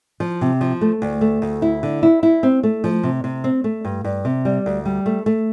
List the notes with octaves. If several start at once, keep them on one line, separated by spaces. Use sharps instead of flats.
F3
C3
F3
A3
D2
A3
D2
E4
D3
E4
E4
C4
A3
F3
C3
C3
C4
A3
G2
G2
C3
G3
D2
G3
A3
A3